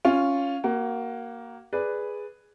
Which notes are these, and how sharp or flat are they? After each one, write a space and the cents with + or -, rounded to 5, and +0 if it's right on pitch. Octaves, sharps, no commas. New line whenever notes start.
C#4 +0 F4 +0
A#3 +5 F#4 +25
G#4 +0 B4 +0 D5 +0